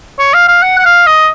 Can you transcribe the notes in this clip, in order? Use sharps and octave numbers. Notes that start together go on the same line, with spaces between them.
C#5
F5
F5
F#5
F#5
F5
D#5